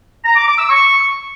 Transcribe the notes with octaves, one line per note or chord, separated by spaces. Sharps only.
A#5
D6
D6
E6
C#6